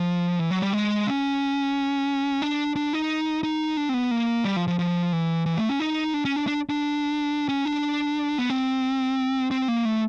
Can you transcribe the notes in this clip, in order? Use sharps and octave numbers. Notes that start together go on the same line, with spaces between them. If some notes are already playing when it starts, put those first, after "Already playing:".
Already playing: F3
E3
F#3
G3
G#3
C#4
D4
D4
D#4
D#4
D4
C4
B3
A#3
G3
F3
F3
F3
E3
E3
A3
C#4
D#4
D4
C#4
D4
D4
D4
C#4
D4
B3
C4
C4
A#3
A3